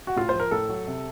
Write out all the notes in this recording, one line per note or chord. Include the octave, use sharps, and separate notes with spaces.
F#4
A2 F4
F3 C5
A#4
A2 A4
F#3
C3